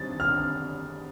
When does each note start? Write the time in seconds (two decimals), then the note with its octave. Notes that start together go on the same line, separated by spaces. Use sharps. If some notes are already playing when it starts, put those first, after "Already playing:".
Already playing: D#3 G3 C4 A6
0.20 F6